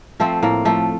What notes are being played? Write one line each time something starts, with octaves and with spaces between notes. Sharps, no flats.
F3 A3 C4
A2 A#3
F3 A3